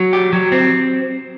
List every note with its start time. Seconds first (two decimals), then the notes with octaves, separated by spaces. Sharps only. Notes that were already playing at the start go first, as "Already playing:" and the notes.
Already playing: F#3
0.13 G4
0.33 F#3
0.52 C4